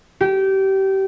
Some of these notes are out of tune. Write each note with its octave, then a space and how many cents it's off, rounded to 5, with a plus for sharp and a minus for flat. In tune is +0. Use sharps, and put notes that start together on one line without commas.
G4 -25